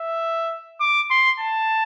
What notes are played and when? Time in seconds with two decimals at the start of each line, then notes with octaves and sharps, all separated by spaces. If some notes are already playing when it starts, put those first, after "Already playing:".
Already playing: E5
0.80 D6
1.11 C6
1.40 A5